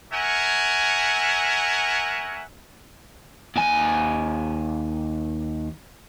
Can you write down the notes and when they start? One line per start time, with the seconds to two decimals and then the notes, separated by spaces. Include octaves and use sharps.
0.13 A#4 C#5 E5 F#5 G#5
3.56 D#2 G#5